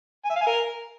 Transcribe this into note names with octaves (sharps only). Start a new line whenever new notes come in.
G#5
E5
F5
G#5
A#4